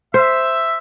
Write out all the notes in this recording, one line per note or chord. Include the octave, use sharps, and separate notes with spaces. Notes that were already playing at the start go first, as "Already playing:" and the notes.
C5 E5